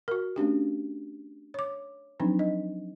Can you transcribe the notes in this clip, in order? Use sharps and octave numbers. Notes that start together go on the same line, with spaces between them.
F#4 A#4
A3 C#4 D4 G4
C#5 D6
F3 F#3 C4 D4 D#4
D#5